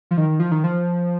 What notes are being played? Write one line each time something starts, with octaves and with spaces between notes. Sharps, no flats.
F3
D#3
F3
D#3
F3